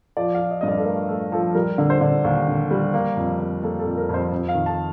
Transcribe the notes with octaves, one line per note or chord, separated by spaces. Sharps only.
F3 D5
F3 F5
D#5
G2 D#5
D5
A4
A3 A#4
A3 A4
F3 A4
G3 A#4
D3
C5
D3
D#2
D3
G3
A#3
F2
A#3
A#3 A4
A4
F2
A#4
F2 C5
F2
F5
D#3
A5